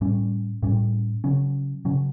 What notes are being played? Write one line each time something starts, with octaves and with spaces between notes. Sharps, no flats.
A2 G3 C#4
A2 G3 C#4
C#3 F#3 C#4
C#3 F#3 C#4